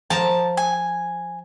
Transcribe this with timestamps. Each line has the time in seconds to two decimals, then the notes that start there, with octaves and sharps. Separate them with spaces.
0.10 F3 A#4 A5 A#5
0.57 G#5